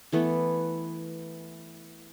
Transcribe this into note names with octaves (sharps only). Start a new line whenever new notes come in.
E3 A3 B3